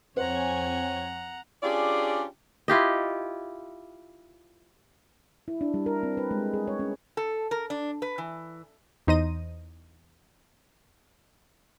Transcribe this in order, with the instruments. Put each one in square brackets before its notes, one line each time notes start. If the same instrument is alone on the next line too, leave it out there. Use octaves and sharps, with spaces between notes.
[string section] F2 C#5 G#5 [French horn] C4 [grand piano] C5 [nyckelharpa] F#5 A#5
[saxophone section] C#4 D4 F4 G4 G#4 D5
[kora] E4 F4 G4 D#5
[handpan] E4
D4
G3
A#4
C4
B4
G#3
G#4
C#5
C#4
[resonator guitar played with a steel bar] A4
A#4
D4
B4
E3
[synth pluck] E2 D#4 C5 D#5 A#6 D#7